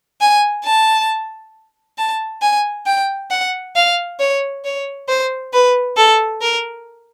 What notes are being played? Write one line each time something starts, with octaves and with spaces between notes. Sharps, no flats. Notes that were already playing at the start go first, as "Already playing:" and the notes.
G#5
A5
A5
G#5
G5
F#5
F5
C#5
C#5
C5
B4
A4
A#4